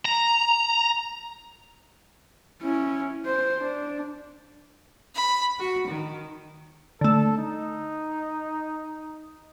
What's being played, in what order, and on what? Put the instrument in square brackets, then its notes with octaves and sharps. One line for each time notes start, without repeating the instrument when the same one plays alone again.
[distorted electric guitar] A#5
[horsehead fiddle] C#4 E4
C5
D4
[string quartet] B5
F#4
D#3
[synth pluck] D3 A3 [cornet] A4
[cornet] D#4